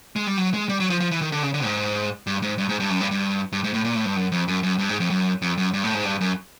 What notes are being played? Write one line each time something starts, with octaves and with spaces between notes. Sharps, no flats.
G#3
G3
F#3
G#3
G3
F#3
F3
F3
E3
D#3
D3
C#3
D3
G#2
G2
G#2
G2
G#2
G2
F#2
G2
G2
G2
G#2
A2
A#2
A2
G2
F#2
F2
F#2
F#2
G2
G#2
F2
F#2
F2
F#2
G2
A2
G#2
G2
F#2